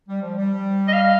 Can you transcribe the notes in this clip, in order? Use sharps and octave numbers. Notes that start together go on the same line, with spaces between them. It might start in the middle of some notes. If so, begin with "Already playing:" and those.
G3
F3
G3
D#5
F5